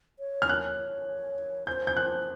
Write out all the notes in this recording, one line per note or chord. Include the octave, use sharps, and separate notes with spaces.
C#5
F6
C#5 F#6
C5 G6
G6
F#6